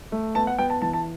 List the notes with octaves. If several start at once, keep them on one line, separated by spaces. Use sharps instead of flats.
A3
B3 A5
F#5
B3 G5
A5
E3 A5
A5